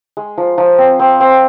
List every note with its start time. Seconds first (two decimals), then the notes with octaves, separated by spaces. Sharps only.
0.17 G#3
0.38 F3
0.58 F3
0.78 C4
0.99 C4
1.20 C4